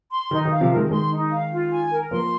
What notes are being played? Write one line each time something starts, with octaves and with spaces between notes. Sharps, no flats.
C6
D#3 D#4
D#3
F5
C3 F3
D#3 G#3 A#4
D#3 G#3 C6
D#4
F5
F4
G#5
A#4
F3 A#3 C6